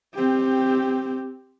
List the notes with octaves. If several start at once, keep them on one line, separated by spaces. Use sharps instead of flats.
C4 G4